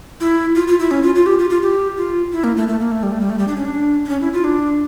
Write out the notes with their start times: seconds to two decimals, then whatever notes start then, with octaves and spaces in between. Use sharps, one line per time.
0.21 E4
0.55 F4
0.68 F4
0.80 E4
0.91 C#4
1.03 F4
1.15 F4
1.26 G4
1.39 F4
1.50 F4
1.62 G4
1.97 F4
2.33 E4
2.44 A#3
2.57 A3
2.68 A3
2.80 A#3
2.91 A3
3.03 G3
3.12 A3
3.21 G3
3.30 A3
3.38 G3
3.48 D4
3.56 C#4
3.65 D4
4.05 D4
4.09 C#4
4.21 E4
4.33 F4
4.44 D4